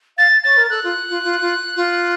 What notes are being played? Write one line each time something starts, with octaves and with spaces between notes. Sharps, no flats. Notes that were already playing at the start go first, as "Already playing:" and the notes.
F5 A6
C#5 A6
A#4
A4 F#6
F4
F4
F4
F4
F4